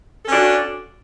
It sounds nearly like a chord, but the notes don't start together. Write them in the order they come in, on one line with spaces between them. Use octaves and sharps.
A4 C#4 D4 F#4